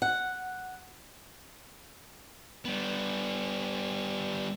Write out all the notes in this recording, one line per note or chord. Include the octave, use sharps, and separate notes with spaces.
F#5
G3 B3